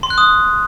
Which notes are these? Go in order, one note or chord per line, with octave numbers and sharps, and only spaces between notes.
C6
F#6
D#6